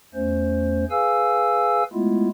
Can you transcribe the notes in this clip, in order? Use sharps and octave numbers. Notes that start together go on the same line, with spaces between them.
E2 A3 C#4 C5
G#4 B4 F5 G#5 E6
G#3 A3 B3 E4 F4